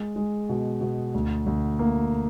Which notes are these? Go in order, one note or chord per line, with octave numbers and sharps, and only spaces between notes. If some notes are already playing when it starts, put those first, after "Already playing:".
Already playing: G#3
G#3
B2
B2
D2
D2
A#3